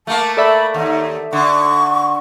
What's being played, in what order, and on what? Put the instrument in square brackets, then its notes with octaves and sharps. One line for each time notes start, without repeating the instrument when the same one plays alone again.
[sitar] A3 A#3 [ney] A5
[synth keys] A4 D5 E5 [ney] B5
[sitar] D#2 [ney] D#4
[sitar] D3 [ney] C#6